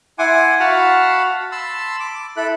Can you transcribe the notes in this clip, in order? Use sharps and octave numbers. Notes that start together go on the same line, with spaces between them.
E4 F#5 G#5 C6 D6
F#4 F5 F#5 A5 B5
A5 B5 C6 E6
D6
E4 A4 B5 F#6